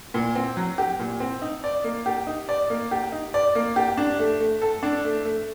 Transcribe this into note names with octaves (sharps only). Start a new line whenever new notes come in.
A#2
C4
F#3
G4
A#2
C4
D#4
D5
A#3
G4
D#4
D5
A#3
G4
D#4
D5
A#3
G4
D4
A3
A3
A4
D4
A3
A3